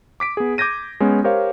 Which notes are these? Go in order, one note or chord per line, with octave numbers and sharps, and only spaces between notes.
D6 B6 D7
B3 G#4
D6 G6 G#6 A#6 D#7
G#3 B3 C#4
G4 A#4 C5 C#5 F5